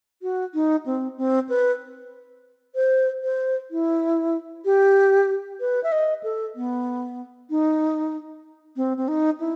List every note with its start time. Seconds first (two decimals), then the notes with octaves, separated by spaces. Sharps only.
0.22 F#4
0.54 D#4
0.86 C4
1.18 C4
1.49 B4
2.75 C5
3.23 C5
3.71 E4
4.65 G4
5.60 B4
5.83 E5
5.92 D#5
6.23 A4
6.55 B3
7.50 D#4
8.76 C4
8.97 C4
9.08 D#4
9.40 E4